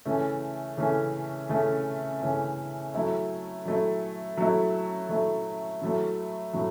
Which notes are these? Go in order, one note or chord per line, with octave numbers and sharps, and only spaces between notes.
C#3 E3 A3 C#4
C#3 E3 A3 C#4
C#3 E3 A3 C#4
C#3 E3 A3 C#4
F#3 A3 E4
F#3 A3 E4
F#3 A3 E4
F#3 A3 E4
A2 F#3 A3
A2 F#3 A3